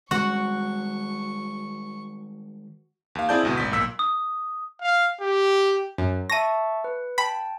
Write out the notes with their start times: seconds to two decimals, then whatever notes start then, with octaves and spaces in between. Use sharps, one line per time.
0.11 D#3 G3 G#3 F#4 F#5 C#6
3.15 D#2 F5
3.29 C4 E4 G#4 D5 A5 G6
3.43 G#1 D2 B2
3.57 G#1 B6
3.71 B1 A#2 E6 B6
3.99 D#6
4.82 F5
5.21 G4
5.98 F#2
6.29 E5 A5 C#6 A#6 D#7
6.84 B4
7.18 G5 A5 B5